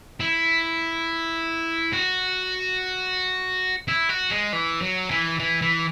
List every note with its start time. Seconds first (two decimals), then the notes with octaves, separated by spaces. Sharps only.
0.20 E4
1.93 F#4
3.88 E4
4.09 F#4
4.31 G#3
4.53 E3
4.82 F#3
5.11 E3
5.39 E3
5.62 E3